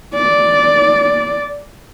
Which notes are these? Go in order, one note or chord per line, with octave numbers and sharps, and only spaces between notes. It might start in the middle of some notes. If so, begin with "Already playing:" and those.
D5